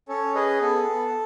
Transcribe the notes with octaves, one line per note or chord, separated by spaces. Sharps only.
C#4 A4 C#5
G#4 B4 D#5
B3 A4
B3